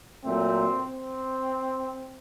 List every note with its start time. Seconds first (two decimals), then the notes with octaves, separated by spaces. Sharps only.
0.25 A#2 F#3 A3 C4
0.84 C4